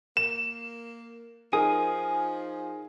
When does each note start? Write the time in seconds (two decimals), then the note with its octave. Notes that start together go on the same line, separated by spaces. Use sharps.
0.17 A#3 E7
1.53 F3 D#4 G#4 A#4 G#5 D#6